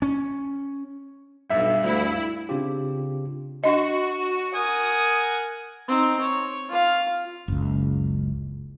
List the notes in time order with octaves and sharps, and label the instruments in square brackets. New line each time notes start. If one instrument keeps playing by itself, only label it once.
[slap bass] C#4
[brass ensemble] B1 [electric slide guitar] G2 [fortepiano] E5
[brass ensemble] D2 [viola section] E4
[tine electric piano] C#3 C4 D4 F4 G4
[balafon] D4 D#5 [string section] F#4
[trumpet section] A#4 F#5 G#5 [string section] D#6
[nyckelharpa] C4 D#4
C#5
F4 F5
[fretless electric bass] F#1 C#2